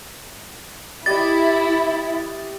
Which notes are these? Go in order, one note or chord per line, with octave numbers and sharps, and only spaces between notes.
E4 G4 D#5 A6